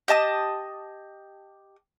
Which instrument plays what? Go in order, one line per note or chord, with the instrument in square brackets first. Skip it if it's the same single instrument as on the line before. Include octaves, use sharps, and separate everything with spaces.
[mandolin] G4 D#5 A5 D#6